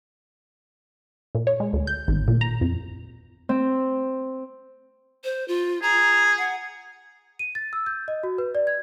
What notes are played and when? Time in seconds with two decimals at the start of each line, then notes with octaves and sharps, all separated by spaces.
1.35 A#2
1.47 C#5
1.60 G#3
1.73 D2
1.87 G6
2.08 G#1
2.28 A#2
2.41 A#5
2.61 F2
3.49 C4
5.24 C5
5.48 F4
5.82 G#4 A#5
6.38 F#5
7.39 D#7
7.55 A6
7.73 E6
7.86 G6
8.08 D#5
8.23 F#4
8.38 B4
8.55 D5
8.67 G#6